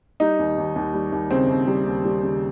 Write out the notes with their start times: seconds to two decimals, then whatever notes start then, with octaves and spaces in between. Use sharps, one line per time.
0.20 G3 D#4
0.39 D#2
0.58 D#2
0.76 D#2
0.94 G3
1.12 D#2
1.30 C#3 C4
1.49 D#2
1.68 G3
1.86 D#2
2.05 G3
2.23 C#3